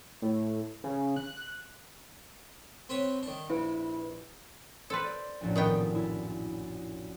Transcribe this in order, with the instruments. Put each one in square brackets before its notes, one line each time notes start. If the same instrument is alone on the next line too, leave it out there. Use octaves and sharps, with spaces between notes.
[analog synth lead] A2
C#3
F#6
[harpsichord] C4 B4 C#5
D#3 D4
[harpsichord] A#1 [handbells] E4 B4
[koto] A4 B4 [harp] C5 C6
[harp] D5
A#1 F#2 A2
[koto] D#3 B3 G5
[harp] E4